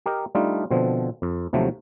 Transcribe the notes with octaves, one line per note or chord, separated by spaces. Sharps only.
G4 A#4 D#5
G3 A3 D4 D#4 F4
B2 D3 F3 C4
F2
D#2 C3 F3 F#3 A3